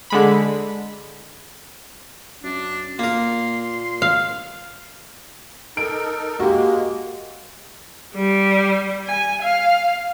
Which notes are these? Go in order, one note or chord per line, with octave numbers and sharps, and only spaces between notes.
D3 G#3 B5
F#2 D4
A#2 A#3 A#4 C6
F5
D#4 A4 A#4 D7
G#3 A#3 F#4 G4
G3
G#5
F5